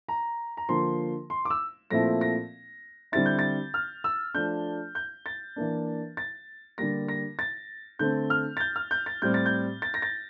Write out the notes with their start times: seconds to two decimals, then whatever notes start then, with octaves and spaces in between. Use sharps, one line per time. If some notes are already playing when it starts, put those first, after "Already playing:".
0.08 A#5
0.57 A#5
0.69 D3 F3 A#3 C6
1.30 C6
1.45 D6
1.50 E6
1.90 A#2 F3 A3 C4 E4 A#6
2.21 A#6
3.12 D3 G3 C4 E4 A6
3.26 G6
3.39 A6
3.74 F6
4.04 E6
4.34 F3 A3 D4 G6
4.95 G6
5.26 A6
5.56 E3 A#3 D4
6.17 A6
6.78 D3 G3 A#3 A#6
7.08 A#6
7.39 A6
7.99 D3 A3 C4 G6
8.30 F6
8.57 A6
8.60 G6
8.76 F6
8.91 G6
9.06 A6
9.22 A2 G3 C4 G6
9.34 A6
9.46 G6
9.82 A6
9.94 A#6
10.02 A6